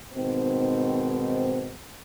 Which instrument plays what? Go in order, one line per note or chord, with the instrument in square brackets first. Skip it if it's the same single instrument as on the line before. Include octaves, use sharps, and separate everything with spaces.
[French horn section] G#2 B2 D#3 C4